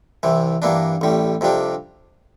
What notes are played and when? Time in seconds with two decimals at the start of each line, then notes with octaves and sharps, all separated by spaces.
0.23 C2 C3 E3
0.62 G2 E3 A#3 D4
1.01 A1 A2 G3
1.41 F2 C3 G3 D4